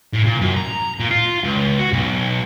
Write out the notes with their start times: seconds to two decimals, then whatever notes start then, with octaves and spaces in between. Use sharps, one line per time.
0.13 A2
0.26 A#2
0.41 F#2
0.56 A#5
1.00 A#2
1.11 F4
1.44 C#2
1.79 F#4
1.93 B1